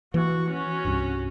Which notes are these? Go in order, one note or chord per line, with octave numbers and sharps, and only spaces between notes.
E3 A#3 F#4 C#6
C#4 F#4
C2 G2